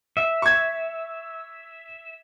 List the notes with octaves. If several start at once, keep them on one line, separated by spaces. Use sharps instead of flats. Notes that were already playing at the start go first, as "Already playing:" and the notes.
E5
C#6 G#6